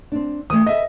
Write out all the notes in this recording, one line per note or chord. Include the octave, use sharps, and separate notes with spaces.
C4 D4
E3 F3 A3 D#6
A4 B4 D#5 E5